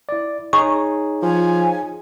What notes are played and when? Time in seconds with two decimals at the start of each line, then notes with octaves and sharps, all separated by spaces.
0.09 E4 D5
0.53 D#4 G#4 C#5 C#6
1.23 F3 G#5